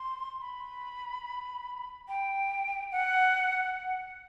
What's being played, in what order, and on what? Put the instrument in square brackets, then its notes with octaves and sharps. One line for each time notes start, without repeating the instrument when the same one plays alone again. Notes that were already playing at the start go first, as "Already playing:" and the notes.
Already playing: [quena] C6
B5
G5
F#5